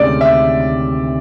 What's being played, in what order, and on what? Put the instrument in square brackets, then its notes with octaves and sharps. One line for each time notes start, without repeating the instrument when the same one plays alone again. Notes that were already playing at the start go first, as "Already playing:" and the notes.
Already playing: [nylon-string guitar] D2 C3 D#3 G#3 C#4 [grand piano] D5
[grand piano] E5